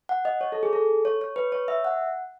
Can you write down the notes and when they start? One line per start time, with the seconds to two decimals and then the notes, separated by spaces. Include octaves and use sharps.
0.09 F#5
0.25 D#5
0.41 C#5
0.52 A4
0.63 G#4
0.73 A4
1.05 C#5
1.21 C#5
1.36 B4
1.52 C#5
1.68 E5
1.84 F#5